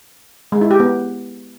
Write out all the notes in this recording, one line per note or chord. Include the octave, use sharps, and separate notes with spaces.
G#3
E4
G4
B3